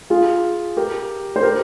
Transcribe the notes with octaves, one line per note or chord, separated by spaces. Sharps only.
F4 G#4
G4 A#4
C5
G4 A#4